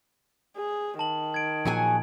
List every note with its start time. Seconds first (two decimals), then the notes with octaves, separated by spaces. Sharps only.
0.57 G#4
0.99 D#3 A5 F#7
1.34 G#6 D7
1.65 A#2 F3 F#3 G#4 G#5